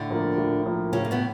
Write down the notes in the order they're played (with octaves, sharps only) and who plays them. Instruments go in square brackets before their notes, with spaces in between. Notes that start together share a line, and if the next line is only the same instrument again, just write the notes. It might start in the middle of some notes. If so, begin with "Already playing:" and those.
Already playing: [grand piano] A2 [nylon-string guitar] D3 D4
[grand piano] F3 A#3
A2
F3 A#3
[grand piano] A2 [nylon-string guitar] C#3 C#4
[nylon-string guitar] A#3
B2 B3